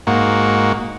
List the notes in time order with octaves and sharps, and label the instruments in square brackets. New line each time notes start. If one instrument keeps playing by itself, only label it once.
[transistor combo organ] G#2 A#3 F#4